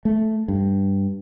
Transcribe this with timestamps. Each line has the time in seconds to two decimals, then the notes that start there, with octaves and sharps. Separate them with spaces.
0.05 A3
0.48 G2